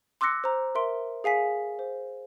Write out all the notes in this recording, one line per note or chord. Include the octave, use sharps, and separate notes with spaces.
C6 D6 E6 F#6 A#6 C#7
C5 A#5
A#4 E5 C6 D7
G#4 F5 G#5 B6
C5